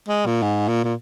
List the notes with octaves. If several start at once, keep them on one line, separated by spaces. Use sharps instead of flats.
G#3
A#2
G#2
A#2
A#2